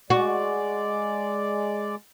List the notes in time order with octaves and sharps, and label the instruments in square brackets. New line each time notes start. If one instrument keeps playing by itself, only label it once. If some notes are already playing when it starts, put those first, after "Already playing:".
[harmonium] G#3 D5 [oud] F#4